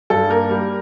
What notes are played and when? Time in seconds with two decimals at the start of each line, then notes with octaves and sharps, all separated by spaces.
0.10 G2 A4
0.29 A#3 A#4
0.50 G3